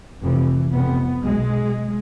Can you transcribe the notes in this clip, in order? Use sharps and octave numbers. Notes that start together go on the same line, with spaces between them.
F1 F2 C3 E3
F1 F2 C3 B3
B1 B2 G#3